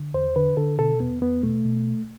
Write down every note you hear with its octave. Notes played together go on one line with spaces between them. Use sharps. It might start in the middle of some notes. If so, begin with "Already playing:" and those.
Already playing: D3
E2 C5
D3 B4
D3 A4
B2 A4
E2 B3
E2 B3
B2 A3
B2